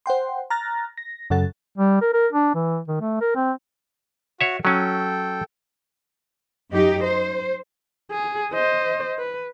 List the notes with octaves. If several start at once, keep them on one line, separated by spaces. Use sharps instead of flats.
C5 F#5 G5 C6
A#5 F6 F#6 A6 A#6
A#6
F#2 C#3 F#3 A4 F#5 A6
G3
A#4
A#4
D4
E3
D#3
A3
A#4
C4
F#4 C#5 E5
F#3 C#4 A4 G5
F#2 D#4 G4
C5
G#4
C5 D#5
B4